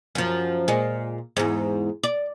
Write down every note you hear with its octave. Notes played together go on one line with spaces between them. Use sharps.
F#2 F3
A#2 G#3
E2 G#2
D5